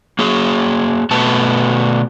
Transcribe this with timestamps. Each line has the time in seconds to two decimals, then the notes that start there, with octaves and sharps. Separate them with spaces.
0.19 A#3 F#4 G#4
1.11 B2 A3 B3 F#4 A5